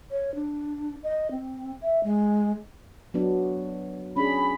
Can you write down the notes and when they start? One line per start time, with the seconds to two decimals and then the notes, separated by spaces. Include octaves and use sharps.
0.10 C#5
0.35 D4
1.03 D#5
1.31 C4
1.81 E5
2.03 G#3
3.14 F#3 B3 D4
4.16 C#4 D4 G#4 B5